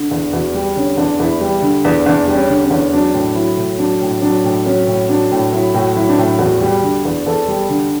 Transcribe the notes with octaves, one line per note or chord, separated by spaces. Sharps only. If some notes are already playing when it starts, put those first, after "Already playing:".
Already playing: D3
E2
E2 F#4
G3
D3 C#4
E2 D4
E2 E4
G3
D3
E2
E2 D4
G3
C#4
D3
C#4
E2
F#3 D4
A2
F#3 E4
A2
F#3 D4
A2
F#3 D4
A2
F#3 C#4
A2
F#3 D4
A2
F#3 E4
A2 F#4
F#3 E4
D4
A2 E4
E2 F#4
G3
D3
E2
E2 A4
G3
D3